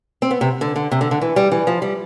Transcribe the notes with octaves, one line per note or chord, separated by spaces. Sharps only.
C4
B3
C3
D3
D3
C3
D3
D3
E3
G3
E3
F3
G3